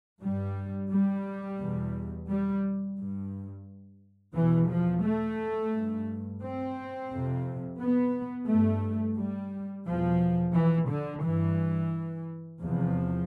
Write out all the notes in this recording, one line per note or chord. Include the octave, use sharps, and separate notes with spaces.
G2 G3
G3
E2 B2
G3
G2
E2 B2 E3
F3
A3
G2
C4
F2 C3
B3
G2 A3
G3
E2 B2 F3
E3
D3
G2 E3
E2 C3 F3